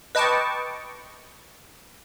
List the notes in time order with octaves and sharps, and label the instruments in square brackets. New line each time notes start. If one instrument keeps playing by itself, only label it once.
[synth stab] B4 D#5 G5 A5 C#6 D6